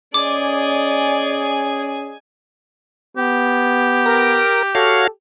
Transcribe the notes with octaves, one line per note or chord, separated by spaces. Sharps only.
C#4 G#4 D5 D#5 G#5 D6
B3 G4
A#4
F#4 A4 C#5 F5